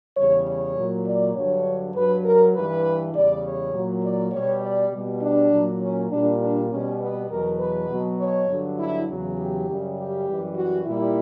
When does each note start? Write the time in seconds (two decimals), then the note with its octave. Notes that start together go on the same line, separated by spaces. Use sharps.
0.16 E2 C#3 G3 C#5
0.46 C#5
0.76 A#2 F#3
1.05 D5
1.35 G2 D3 F#3 C#5
1.94 G2 F#3 B4
2.24 A#4
2.54 G2 E3 G3 B4
3.13 E2 C#3 G3 D5
3.42 C#5
3.73 A#2 F#3
4.03 D5
4.32 B2 G3 C#5
4.61 D5
4.92 B2 G3
5.21 D4
5.51 A#2 F#3
5.80 C#4
6.10 A#2 G3 D4
6.40 D4
6.70 B2 G3 C#4
7.00 B3
7.29 E2 B2 F#3 A#4
7.59 B4
7.89 B2 F#3
8.18 C#5
8.48 G2 D3 F#3
8.77 E4
9.08 E2 C#3 F#3
9.37 G4
9.67 F#2 C#3 G3
9.97 G4
10.27 F#2 E3 G3
10.56 F#4
10.85 A#2 G3 E4